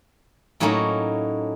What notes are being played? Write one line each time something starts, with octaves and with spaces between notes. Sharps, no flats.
A2 F#3 A#3 C#4 D#4 F#4